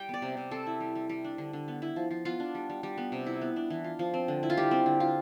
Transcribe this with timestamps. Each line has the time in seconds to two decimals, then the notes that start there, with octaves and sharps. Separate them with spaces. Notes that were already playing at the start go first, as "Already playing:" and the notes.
Already playing: G3 G5
0.09 B3 D5
0.22 C3
0.37 C3
0.51 C4 A4
0.66 E4
0.80 G3
0.95 G3
1.09 G3
1.24 D4
1.38 D3
1.53 D3
1.68 B3
1.82 E4
1.96 F3
2.11 F3
2.25 B3 F4
2.40 D4
2.55 G3
2.70 G3
2.83 G3
2.98 B3
3.12 C3
3.26 E4
3.41 B3
3.56 D4
3.70 E3
3.84 F4
3.99 F3
4.14 C4
4.28 D3
4.43 E4
4.50 F4
4.57 G3 G4
4.71 C4
4.86 D3
5.00 F4